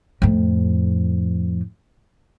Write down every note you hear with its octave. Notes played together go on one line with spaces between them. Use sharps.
F2 A2